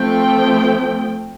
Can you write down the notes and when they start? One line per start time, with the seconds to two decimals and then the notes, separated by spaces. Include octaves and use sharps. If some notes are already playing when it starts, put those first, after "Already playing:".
Already playing: F3 A3 C4 G5